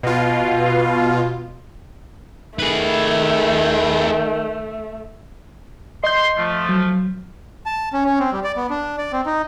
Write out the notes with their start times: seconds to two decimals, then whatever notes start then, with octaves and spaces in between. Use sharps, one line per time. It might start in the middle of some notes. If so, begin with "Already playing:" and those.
0.03 B2 F4
2.59 D#3 A3 G#4 B4
6.04 D#5 C6 G6
6.37 F3 A3
6.69 F#3
7.66 A5
7.93 C#4
8.05 C#4
8.19 C4
8.33 G3
8.44 D5
8.57 B3
8.70 D4
8.98 D5
9.13 C4
9.26 D#4